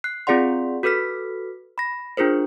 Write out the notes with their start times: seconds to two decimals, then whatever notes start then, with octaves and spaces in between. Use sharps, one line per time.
0.04 F#6 C7
0.27 C4 F4 G#4 D5 F#5 C6
0.83 F#4 A4 B4 F6 B6
1.78 B5 A#6
2.17 D4 F4 G#4 A#4 C5